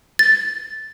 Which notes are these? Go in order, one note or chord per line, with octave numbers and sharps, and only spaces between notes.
A6